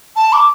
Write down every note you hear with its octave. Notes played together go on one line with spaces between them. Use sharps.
A5
D6